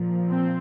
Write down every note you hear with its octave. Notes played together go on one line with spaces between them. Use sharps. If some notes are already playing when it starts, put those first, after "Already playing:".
Already playing: A#2 F3
C4